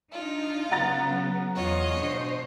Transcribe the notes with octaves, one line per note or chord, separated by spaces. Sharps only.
D4 D#4 F4
C#3 F#3 B3 F#5 A#5 A6
E2 F4 G#4 C#5 D#5
B2 D4 C5